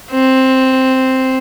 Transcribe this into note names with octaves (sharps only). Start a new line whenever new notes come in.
C4